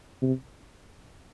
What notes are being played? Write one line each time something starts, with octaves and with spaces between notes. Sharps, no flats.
C3